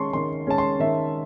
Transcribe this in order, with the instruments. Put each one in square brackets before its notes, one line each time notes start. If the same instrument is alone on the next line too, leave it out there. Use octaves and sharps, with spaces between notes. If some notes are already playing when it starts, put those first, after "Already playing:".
Already playing: [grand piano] D#3 G#3 C#4 A5 C6 C#6
D#3 C6
G#3 C#4 A5
C6
D#3 E5